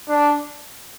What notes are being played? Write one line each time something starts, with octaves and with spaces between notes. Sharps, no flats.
D4